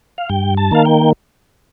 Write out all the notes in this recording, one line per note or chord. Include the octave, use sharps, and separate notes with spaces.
F5
G2 G5
A5
D#3 A#3 F5
G5